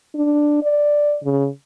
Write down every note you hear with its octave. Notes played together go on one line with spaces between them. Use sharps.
D4
D5
C#3